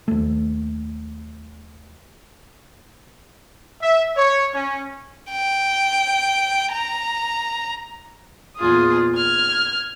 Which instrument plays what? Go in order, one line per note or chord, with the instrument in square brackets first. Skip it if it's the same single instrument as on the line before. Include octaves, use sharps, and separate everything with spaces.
[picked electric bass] D#2 A3
[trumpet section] E5
C#5
C#4
[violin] G5
A#5
[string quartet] E2 A#2 F4 G#4 D#6
F6 G#6